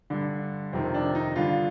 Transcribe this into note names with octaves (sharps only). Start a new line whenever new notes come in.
G2 D3
F2 C3 D#3 C4
D4
D#4
G2 D3 F4